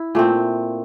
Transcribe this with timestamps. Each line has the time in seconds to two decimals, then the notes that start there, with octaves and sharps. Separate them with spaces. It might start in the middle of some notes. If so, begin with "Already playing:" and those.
Already playing: E4
0.15 A#2 A3 C4